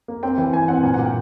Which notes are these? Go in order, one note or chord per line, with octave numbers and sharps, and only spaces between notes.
A#3
C4 G5
E3
E3 G#5
C4 F#5
A#2 G#5
A#2 F#5
G5